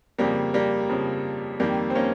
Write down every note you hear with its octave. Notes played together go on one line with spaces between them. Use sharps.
F2 C#3 F3 G3 A#3
G3 A#3
F2 C#3 F3
F2 D#3 G3 A#3
C4
A#3 C#4